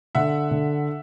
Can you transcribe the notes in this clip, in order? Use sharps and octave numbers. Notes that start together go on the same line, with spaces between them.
D3 E5 F#5
D3